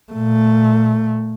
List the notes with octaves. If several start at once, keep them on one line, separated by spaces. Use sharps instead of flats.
A#2 A3